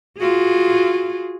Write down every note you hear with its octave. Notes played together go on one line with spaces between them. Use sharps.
F4 F#4 G#4